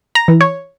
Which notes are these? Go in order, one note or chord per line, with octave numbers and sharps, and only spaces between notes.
A#5
E3
C#5